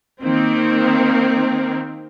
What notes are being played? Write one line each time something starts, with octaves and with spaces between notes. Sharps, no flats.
D#3 A#3 C4